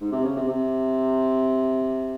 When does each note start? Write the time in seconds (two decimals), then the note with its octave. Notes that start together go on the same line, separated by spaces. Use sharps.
0.01 G#2
0.12 C3
0.25 C#3
0.37 C3
0.48 C3